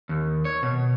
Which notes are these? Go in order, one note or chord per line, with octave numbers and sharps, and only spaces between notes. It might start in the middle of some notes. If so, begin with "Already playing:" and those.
D#2
C#5
B2